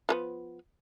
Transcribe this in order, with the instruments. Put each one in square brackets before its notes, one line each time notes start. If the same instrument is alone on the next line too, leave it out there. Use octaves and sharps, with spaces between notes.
[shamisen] F3 A3 B3